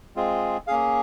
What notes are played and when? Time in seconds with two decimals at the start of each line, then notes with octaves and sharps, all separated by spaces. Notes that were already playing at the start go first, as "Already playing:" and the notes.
0.16 G#3 C4 F4 G#4
0.67 A#3 C#4 G#4 F5